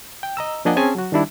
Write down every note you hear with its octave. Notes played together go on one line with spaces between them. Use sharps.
G5
D#5 A#5 E6
F3 A#3 D4 D#5 F#5 G#5
C4 C#4 G#4 G#5 A5
F#3 F#4
D#3 G3 D4 E4